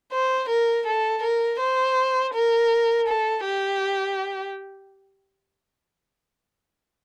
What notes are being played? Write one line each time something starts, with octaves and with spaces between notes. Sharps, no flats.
C5
A#4
A4
A#4
C5
A#4
A4
G4